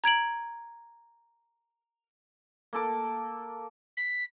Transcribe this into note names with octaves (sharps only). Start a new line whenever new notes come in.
A#5 G#6 D7 F#7
A#3 A4 D6
B6